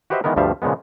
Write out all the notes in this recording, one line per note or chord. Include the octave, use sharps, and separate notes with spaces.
F#4 G4 B4 C5 D#5 E5
D#3 E3 G#3 B3 A#4
D2 G2 F3 G3 E5 F5
A#2 C#3 F3 G#3 B3